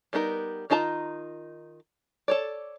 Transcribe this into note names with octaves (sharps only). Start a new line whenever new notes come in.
G3 B3 D#4 A#4
D#3 D#4 F4 A5 A#5
A4 C#5 D5